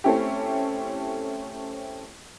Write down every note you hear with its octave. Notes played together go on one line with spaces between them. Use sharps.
A3 C4 C#4 E4 G4